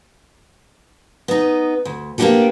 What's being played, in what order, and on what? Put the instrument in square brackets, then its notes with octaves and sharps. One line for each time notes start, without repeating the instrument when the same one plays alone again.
[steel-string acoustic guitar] B3 D#4
D2
A#3 B3 D4 F#4 G4 A4